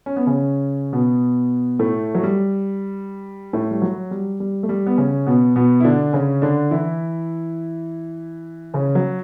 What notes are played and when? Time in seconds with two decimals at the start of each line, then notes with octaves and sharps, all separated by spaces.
0.06 C#4
0.17 B3
0.27 C#3 C#4
0.93 B2 B3
1.79 A2 A3
2.15 F#3
2.23 G3
3.53 A2 A3
3.71 G3
3.82 F#3
4.11 G3
4.40 G3
4.63 A3
4.69 G3
4.87 B3
4.98 C#3 C#4
5.27 B2 B3
5.56 B2 B3
5.80 E4
5.85 D3 D4
6.13 C#3 C#4
6.42 D3 D4
6.71 E3 E4
8.74 C#3 C#4
8.95 F#3